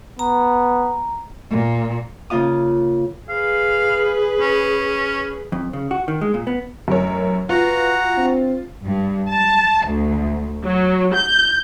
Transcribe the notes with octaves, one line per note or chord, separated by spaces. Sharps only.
B3 A#5
A#2
C#3 A#3 F4 F5 D#6
G#4 B4 F5
C#4
F2
C#3
F#4
D#3
G#3
A#2
B3
A1 F#2 A#4 C#5
F4 F#4 B4 F#5 A#5
C4 D4
G2
A5
D2
F#3
G6